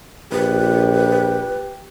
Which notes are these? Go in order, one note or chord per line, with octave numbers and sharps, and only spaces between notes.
A#1 G4 B4